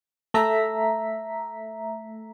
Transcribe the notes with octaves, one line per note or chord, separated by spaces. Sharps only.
A3 A4 E5 A#5 B6